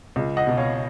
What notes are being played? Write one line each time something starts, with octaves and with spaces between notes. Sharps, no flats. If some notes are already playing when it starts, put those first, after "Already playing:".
C#2
D#5 F#5
B2
C#5 F5